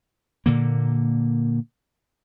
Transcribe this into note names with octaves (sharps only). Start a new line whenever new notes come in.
A#2 D3 A#3